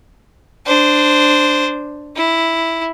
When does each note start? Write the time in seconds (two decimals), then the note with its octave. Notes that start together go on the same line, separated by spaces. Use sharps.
0.66 D4 C5
2.16 E4